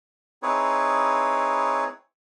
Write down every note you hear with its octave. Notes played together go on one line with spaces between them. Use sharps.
C4 D#4 E4 G#4 B4 C#5